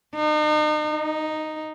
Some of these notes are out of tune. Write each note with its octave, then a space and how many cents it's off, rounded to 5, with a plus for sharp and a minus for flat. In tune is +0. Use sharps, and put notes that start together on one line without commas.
D#4 -40
D#4 -5